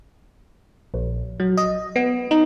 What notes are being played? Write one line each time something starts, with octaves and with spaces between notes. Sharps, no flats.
A#1
F#3
D#5
B3
D#4